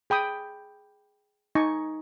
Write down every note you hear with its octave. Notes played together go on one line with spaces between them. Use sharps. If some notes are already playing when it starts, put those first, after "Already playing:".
G#4 G5 B5 D#6
D#4 G#5 C#6